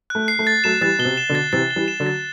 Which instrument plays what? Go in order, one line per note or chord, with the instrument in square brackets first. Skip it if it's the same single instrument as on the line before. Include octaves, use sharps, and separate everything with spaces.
[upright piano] A3 [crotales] F#6
[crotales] C7
[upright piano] A3
[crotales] A6
[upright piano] F#3 A3 [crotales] E7
[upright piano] E3 G3 [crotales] A6
[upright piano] B2 [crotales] G7
[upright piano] C3
[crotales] E7
[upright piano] B2 D3
[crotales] A6
[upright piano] C3 E3 [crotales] A6
[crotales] G7
[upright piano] E3 G3
[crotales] E7
[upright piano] D3 F#3
[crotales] A6